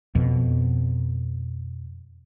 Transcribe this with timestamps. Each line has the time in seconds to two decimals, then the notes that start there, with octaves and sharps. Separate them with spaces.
0.15 F2 B2